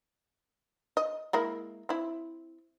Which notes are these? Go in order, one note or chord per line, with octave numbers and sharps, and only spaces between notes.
D#5
G#3 A#3 E4
C4 E4